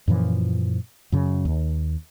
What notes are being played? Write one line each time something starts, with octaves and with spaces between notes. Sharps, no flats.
F#2 A#2 E3 F3
F#2 C#3
D#2